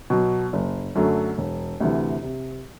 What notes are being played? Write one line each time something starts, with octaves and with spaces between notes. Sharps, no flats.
B2 F#3
F#1
F#2 D3 F#3 A3
E1
D2 C3 E3
C3